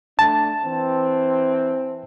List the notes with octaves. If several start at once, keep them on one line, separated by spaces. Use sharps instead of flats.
A3 D4 A5
E3 C4